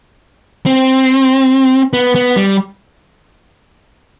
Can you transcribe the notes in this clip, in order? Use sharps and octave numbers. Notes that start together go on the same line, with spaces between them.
C4
B3
B3
G3